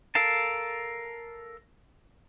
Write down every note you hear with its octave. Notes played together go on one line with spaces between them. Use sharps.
A4 A#4 F5 A5